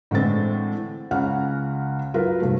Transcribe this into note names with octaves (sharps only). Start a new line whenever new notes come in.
A2 D3 E3 G#3 C4 A6
C#2 C#3 F#5 F6
F#3 E4 F4 A#4 B4
F1 G2 A3